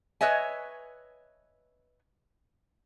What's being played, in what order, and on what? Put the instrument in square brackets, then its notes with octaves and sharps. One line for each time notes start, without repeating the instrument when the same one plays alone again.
[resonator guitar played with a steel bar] B4 C#5 D#5 E5 G#5